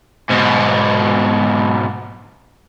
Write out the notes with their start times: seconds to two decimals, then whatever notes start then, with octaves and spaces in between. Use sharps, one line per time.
0.29 G#2 B2